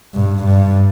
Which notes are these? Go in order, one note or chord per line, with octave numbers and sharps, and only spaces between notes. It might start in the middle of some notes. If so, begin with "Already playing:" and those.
G2
G2